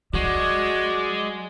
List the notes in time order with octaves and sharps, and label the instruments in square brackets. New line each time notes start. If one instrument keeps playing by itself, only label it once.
[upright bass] F#3 [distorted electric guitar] G#3 [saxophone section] F#4 [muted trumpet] D5